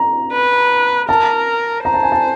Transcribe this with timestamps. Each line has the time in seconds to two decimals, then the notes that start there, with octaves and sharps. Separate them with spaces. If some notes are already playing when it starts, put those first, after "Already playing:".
Already playing: A#5
0.32 B4
1.09 A#4 A5
1.85 C5 A#5
1.94 A5
2.03 G#5
2.12 A5